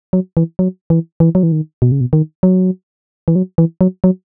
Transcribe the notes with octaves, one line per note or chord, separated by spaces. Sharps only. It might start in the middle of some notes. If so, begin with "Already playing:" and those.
F#3
E3
F#3
E3
E3
F#3
E3
D#3
B2
C#3
B2
D#3
F#3
E3
F#3
E3
F#3
F#3